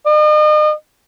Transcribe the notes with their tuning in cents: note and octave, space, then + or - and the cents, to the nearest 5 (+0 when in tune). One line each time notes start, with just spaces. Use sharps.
D#5 -40